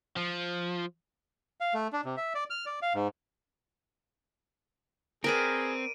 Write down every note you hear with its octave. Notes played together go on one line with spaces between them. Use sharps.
F3
F5
A3
D4
C3
E5
D5
F6
D5
F5
G#2
C4 G#4 A#4 B4 D5 D7 D#7